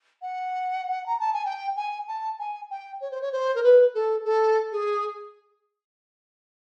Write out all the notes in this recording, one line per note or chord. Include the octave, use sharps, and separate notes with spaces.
F#5
A#5
A5
G#5
G5
G#5
A5
G#5
G5
C#5
C5
C#5
C5
A#4
B4
A4
A4
G#4